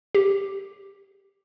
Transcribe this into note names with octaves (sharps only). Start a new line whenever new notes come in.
G4